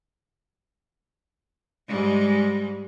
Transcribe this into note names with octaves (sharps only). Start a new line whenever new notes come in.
G#2 G3 G#3